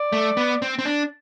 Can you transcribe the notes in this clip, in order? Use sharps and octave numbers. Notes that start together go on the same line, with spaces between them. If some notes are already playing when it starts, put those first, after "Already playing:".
Already playing: D5
A3
B3
C4
C4
D4